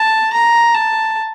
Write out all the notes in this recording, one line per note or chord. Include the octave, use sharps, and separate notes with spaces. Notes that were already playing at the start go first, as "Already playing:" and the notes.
Already playing: A5
A#5
A5